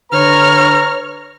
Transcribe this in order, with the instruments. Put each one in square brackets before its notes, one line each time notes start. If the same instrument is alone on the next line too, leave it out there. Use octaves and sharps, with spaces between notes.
[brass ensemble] D3 B4 A#5 [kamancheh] C#5 F6